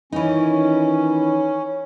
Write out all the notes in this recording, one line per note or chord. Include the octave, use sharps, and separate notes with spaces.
D#3 E3 C#4 D#4